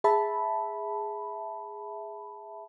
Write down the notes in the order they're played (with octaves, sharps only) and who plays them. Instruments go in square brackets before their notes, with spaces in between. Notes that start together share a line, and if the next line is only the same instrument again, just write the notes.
[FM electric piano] G#4 E5 A5 B5